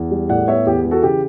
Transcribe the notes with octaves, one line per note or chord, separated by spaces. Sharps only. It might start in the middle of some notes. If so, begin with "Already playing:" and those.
Already playing: E2
G3
A2 D5 F#5
B3 C#5 E5
E2 G4
E3
F#4 A4
C#3 G4